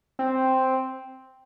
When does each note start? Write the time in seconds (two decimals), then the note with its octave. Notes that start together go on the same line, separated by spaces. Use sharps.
0.19 C4